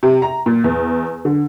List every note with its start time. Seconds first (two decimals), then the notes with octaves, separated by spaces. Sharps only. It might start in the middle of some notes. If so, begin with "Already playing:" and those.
0.03 C3
0.22 A#5
0.46 A#2
0.64 E2
1.25 D3